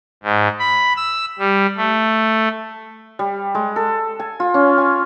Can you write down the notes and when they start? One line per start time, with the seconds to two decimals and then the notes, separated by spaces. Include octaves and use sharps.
0.23 G#2
0.59 B5
0.96 E6
1.39 G3
1.77 A3
3.19 G3
3.55 G#3
3.76 A4
4.20 G#5
4.40 F4
4.54 C#4
4.78 G#5